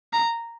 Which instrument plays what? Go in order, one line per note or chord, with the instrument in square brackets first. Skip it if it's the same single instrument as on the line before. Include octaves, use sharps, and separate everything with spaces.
[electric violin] A#5